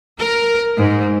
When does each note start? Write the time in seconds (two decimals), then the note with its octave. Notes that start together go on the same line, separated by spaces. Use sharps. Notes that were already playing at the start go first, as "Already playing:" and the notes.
0.18 A#4
0.78 G#2